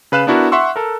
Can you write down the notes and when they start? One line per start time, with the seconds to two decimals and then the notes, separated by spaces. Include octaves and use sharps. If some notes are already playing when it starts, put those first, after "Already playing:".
0.12 C#3 B4 F5 F#6 E7
0.27 B3 D4 E4 F#4 A#4
0.52 E5 F#5 C6 C#6 E6
0.76 A4 A#4